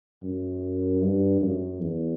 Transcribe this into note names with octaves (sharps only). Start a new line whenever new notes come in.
F#2
G2
F#2
E2